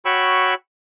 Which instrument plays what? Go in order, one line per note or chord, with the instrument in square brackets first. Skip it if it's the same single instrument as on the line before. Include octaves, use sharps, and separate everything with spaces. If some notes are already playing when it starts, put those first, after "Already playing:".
[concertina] F#4 C#5 G5 B5 C#6 E6